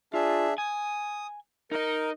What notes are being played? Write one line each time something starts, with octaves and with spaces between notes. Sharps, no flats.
D4 F4 G#4 E5
G#5 D#6
D#4 A#4 D#5